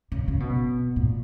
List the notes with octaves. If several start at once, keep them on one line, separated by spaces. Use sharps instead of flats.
C#3
C#3
B2
A#2